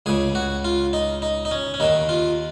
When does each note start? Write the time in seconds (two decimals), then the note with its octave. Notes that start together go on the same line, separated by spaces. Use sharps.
0.06 C#2 C#3 G#4
0.35 F#4
0.65 F4
0.93 D#4
1.22 D#4
1.45 D#4
1.51 C#4
1.74 C#4
1.80 D#2 D#3 D#4
2.09 F4